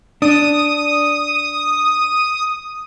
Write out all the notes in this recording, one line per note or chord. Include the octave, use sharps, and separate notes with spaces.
D4 D#6